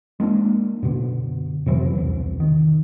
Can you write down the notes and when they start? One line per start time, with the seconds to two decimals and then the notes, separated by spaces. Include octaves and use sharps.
0.20 G#3 A#3 C4 D4
0.83 F#2 B2 D3
1.66 F2 C3 E3 F#3
1.95 E1 C2
2.40 D#3